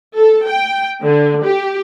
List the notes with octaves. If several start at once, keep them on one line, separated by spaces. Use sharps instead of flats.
A4
G5
D3
G4